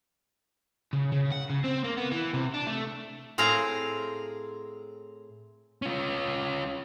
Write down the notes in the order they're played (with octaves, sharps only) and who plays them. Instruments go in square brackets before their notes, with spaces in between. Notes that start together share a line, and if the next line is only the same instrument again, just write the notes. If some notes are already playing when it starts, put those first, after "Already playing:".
[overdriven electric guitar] C#3
C#3
F#5
C#3
C4
A#3
B3
E3
C3
D4
A3
[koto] A2 C4 G#4 A#4 F5 A#5
[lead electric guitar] C#4 F4